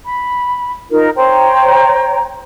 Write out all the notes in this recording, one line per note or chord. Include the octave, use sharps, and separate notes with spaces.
B5
D#4 F4 A#4
C5 C#5 G5 A#5